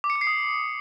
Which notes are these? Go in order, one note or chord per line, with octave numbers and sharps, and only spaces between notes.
D6
C#7
D6
C7
D#6